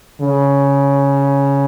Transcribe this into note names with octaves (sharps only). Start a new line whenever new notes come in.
C#3